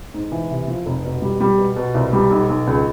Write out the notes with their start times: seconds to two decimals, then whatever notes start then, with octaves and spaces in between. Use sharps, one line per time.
0.14 G#2
0.32 E3
0.50 C3
0.68 F3
0.86 F1
1.05 B2
1.22 G3
1.41 G3
1.58 B2
1.76 B2
1.95 C2
2.13 G3
2.31 B1
2.49 B1
2.67 C#2